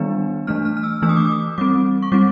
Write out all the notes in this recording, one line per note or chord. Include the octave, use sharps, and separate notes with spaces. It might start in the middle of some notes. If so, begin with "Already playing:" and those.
Already playing: D#3 G3 B3 D4
E3 A3 D4 F6
F6
F6
E6
E3 A3 D4 E6
D#6
D6
D#6
G3 C4 D6
C#6
G3 C4 D6